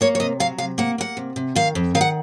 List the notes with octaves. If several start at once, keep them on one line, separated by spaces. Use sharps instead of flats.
A#3 C#5
C#5
C3 D#5
F#3 F5
C3 F5
A#3 F#5
A#3 F#5
C3
C3
D#3 F5
F2
D#3 F5
F#5